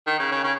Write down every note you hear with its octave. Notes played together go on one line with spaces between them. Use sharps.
D#3
C#3
C#3
C#3